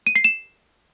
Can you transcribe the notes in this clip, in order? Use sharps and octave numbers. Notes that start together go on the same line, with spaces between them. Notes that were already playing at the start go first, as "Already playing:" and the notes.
D#7
C7
E7